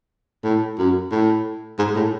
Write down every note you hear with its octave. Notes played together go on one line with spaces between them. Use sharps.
A2
F#2
A2
G#2
A2